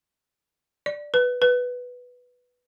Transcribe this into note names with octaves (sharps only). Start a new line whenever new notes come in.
D5
B4
B4